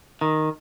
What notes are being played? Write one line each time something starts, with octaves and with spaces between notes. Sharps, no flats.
D#3